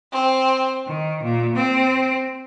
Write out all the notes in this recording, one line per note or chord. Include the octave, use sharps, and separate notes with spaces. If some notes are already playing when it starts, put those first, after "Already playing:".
C4
D#3
A#2
C4